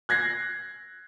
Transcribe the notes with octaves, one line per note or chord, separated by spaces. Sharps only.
F#6 G#6 A#6 C7